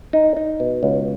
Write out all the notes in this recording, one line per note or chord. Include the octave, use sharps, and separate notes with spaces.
D#4
D#4
B2
C#2